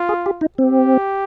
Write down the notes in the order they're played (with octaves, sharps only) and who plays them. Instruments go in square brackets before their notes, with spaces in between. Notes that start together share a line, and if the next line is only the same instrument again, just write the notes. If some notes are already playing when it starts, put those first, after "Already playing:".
Already playing: [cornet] F4
[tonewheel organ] G#4
G4
D#4
[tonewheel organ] C4 [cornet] G4